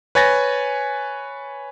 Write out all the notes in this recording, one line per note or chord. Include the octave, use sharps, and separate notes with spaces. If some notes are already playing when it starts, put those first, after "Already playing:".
B4 C#5 G#5 A6 A#6